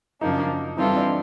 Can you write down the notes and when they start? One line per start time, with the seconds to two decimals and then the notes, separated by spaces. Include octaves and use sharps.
0.21 F#2 C#3 F3 A#3 D4 D#4
0.77 E3 G3 C4 D#4 F4 A4
0.96 D4